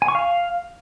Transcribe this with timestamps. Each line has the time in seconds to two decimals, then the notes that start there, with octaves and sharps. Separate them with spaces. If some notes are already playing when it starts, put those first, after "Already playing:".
0.02 G#5
0.08 C#6
0.15 F5